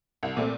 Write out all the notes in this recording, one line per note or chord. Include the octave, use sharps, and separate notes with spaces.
C2
A#2 A3 C4